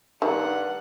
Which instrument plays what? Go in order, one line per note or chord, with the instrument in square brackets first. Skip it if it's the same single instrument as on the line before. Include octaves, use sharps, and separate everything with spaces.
[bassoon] G2 [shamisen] D#3 [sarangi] F#5